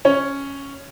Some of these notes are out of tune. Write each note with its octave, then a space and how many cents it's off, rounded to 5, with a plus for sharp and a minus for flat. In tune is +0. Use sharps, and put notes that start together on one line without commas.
C#4 +0 C#5 +0